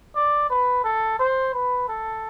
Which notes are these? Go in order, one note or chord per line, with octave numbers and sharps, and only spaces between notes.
D5
B4
A4
C5
B4
A4